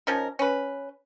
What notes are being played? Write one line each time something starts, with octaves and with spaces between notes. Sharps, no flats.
F3 C#4 D#4 A#4
C#4 B4